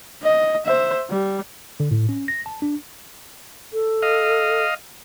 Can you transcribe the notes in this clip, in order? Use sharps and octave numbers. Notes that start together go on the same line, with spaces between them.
D#5
C5 E5
G3
D3
A2
C#4
A#6
A5
D4
A4
D#5 F5